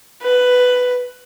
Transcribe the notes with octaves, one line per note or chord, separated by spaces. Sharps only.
B4